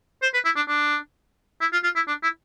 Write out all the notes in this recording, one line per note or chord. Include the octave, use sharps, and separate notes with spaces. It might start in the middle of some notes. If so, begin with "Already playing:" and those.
C5
B4
E4
D4
D4
E4
F4
F4
E4
D4
E4